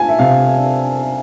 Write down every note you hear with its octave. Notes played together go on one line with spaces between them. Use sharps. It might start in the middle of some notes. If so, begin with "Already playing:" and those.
Already playing: F4 G#5 A5
E5
C3 F5
D4